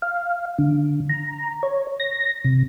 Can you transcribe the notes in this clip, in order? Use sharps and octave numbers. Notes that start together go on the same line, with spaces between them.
F5
D3
A#5
C#5
A#6
C3